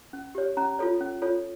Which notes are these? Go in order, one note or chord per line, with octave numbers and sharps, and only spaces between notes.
C#4
G4 C#5
C#4 A#5
F4 A4 C#5
C#4
F4 A4 C#5